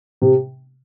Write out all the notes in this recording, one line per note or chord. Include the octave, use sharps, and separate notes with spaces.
C3